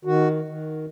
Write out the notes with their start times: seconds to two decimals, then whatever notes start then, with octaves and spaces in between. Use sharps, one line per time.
0.05 D#3 F#4
0.44 D#3